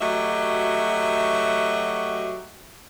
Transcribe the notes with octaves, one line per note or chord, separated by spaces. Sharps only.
F#3 A3 F#4 G4 D#5 E5